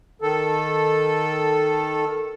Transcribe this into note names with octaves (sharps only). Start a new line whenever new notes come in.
D#3 A4